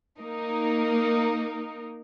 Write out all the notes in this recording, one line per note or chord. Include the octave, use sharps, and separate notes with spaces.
A#3 D#4 A#4